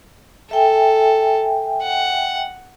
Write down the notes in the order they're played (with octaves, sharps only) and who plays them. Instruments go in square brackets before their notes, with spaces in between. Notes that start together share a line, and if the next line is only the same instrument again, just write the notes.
[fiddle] A4 [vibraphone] E5 G5 G#5
[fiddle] F#5